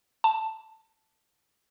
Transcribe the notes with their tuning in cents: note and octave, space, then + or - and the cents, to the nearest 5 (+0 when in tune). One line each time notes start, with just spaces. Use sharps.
A5 +5